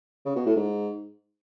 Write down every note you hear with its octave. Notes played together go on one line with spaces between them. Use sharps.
C#3
B2
A2
G#2